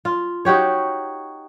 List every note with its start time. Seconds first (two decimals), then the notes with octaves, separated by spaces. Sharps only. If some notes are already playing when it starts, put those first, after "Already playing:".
0.05 F4
0.45 D#4 F#4 G4 C#5